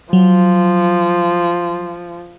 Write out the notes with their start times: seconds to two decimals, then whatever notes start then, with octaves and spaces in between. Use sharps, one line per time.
0.13 F3 F#3